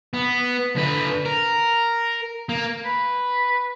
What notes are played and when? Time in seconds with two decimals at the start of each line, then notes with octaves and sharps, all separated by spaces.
0.14 B3
0.76 D3 B4
1.25 A#4
2.49 A#3
2.85 B4